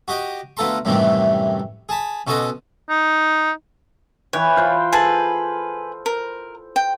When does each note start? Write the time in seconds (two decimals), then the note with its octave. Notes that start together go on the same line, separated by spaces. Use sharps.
0.08 F#4 G4 D#5 G5
0.57 D2 B3 F4 A4 A#5 C6
0.85 F#2 A2 C3 D#3 E3 G3
1.89 G#4 A5 B5
2.27 B2 C#4 F#4 A4 D#5 C6
2.90 D#4
4.33 E3 B4 C#5 G5
4.57 F4 C5 B5
4.93 G#4 A4 B4 A5
6.06 A#4
6.76 G5